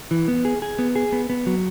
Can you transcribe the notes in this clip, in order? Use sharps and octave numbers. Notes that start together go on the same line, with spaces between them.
E3
B3
G#4
G#4
B3
G#4
B3
B3
F#3